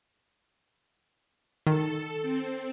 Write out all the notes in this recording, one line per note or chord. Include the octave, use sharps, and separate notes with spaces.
D#3 A4
C4